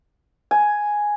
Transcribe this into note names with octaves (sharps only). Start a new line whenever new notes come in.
G#5